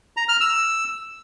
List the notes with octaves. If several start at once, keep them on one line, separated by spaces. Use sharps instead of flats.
A#5
F6
E6